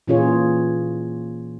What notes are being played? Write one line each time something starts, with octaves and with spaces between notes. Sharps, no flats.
A#2 E3 C#4 F4 G#4 C#5